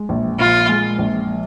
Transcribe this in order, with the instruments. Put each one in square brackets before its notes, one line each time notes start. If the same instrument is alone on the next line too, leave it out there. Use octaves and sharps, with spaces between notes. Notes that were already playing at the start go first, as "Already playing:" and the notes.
Already playing: [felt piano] G#3
A#1
[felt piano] A#2 [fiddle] F4
[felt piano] G#3
A#1